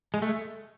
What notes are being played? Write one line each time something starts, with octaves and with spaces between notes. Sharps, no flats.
G#3
A3